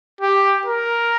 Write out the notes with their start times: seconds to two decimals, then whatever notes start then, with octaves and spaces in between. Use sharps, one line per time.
0.21 G4
0.66 A#4